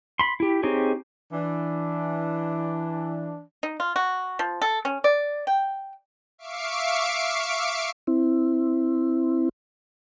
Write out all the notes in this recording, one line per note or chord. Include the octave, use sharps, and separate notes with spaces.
B5 C6
E4 G4
C4 D#4 G4 G#4 C#5
E3 D4
D#4
F4
F#4
F3
A4
C#4
D5
G5
E5 F5 C#6 D6 C7 D7
C4 E4